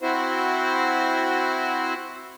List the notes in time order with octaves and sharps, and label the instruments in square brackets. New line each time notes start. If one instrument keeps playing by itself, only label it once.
[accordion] C4 E4 F#4 C5